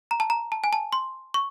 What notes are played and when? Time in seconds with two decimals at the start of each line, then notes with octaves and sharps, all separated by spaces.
0.11 A#5
0.20 A5
0.30 A#5
0.52 A5
0.64 G#5
0.73 A5
0.92 C6
1.34 C#6